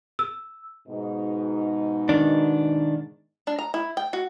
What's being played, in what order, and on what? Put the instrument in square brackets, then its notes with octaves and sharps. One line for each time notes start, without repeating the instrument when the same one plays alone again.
[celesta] E6
[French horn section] G#2 B2 D#4
[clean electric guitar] D#3 D4
[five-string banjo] D4
A#5
E4
G5
F#4